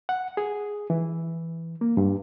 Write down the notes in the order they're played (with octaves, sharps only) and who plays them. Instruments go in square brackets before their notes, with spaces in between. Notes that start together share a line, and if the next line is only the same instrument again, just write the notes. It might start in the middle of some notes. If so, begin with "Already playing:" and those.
[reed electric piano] F#5
G#4
E3
A#3
G2